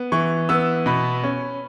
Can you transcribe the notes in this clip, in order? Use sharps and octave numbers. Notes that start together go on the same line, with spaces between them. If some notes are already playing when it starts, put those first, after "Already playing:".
Already playing: B3
E3 C#6
B3 E6
B2 B5
C#4